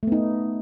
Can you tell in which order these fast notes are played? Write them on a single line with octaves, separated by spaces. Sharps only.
A3 B3 D#4